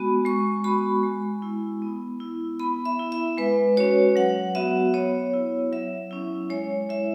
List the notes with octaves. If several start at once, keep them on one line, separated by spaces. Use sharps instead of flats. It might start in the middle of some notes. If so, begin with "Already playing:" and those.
Already playing: G#3 B3 F#4 B5
G#3 C#6
B3 F#4 B5
G#3
E4
B3
E4
B3 B5
E5
E4
E5
G#3 B4
C#4 F#4 C#5
F#3 F#5
B3 F#4 E5
B3 C#5
E4
F#3 E5
C#4 E4
G#3 C#5
E4 E5